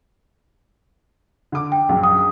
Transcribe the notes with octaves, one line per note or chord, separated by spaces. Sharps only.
D3 D6
G5
A#1 F#2
D#6